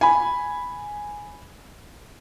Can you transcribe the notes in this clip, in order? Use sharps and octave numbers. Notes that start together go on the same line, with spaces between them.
G#5 B5